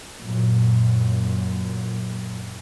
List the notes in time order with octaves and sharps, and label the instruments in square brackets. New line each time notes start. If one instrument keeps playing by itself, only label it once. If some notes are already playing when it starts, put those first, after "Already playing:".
[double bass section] F#2 A#2